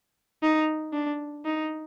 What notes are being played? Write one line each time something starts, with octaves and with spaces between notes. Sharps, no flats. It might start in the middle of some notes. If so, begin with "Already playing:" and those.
D#4
D4
D#4